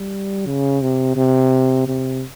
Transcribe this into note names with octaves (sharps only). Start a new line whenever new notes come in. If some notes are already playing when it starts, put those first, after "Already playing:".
Already playing: G3
C#3
C3
C3
C3